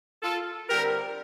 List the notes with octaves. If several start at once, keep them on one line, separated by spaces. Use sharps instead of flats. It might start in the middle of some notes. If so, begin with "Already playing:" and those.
F4 A4
D3 G3 C4 G4 A#4